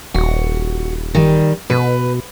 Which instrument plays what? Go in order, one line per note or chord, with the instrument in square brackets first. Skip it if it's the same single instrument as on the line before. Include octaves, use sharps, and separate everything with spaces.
[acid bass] D#1 [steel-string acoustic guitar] F#4
[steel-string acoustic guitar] D#3 G3
[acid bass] B2 [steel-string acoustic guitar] B4